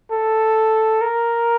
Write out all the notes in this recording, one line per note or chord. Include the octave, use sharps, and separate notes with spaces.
A4
A#4